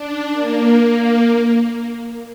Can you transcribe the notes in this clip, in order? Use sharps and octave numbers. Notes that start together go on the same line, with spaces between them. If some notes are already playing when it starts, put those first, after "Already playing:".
Already playing: D4
A#3
A#3